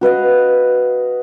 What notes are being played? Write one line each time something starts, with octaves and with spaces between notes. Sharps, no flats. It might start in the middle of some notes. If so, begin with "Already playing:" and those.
F#4 B4 D#5 F5